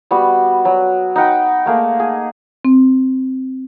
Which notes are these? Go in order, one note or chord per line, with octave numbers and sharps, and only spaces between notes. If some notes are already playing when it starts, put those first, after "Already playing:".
G3 B3 F#4
F#3
D#4 B4 F#5 G5
A3 A#3 G#4
G#4
C4